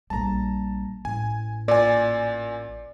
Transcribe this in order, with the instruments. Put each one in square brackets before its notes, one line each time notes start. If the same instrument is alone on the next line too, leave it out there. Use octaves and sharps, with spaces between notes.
[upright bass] A#1 G3 [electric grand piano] A5 A#5
[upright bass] A1 [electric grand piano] G#5
[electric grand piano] A#2 G#5 [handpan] D5